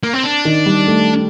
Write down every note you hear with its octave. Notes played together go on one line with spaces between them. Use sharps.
A#3
C4
D4
D#3
G3
A3